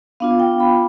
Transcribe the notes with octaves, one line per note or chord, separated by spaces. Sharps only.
B3 D4 F4 F5
G5
B5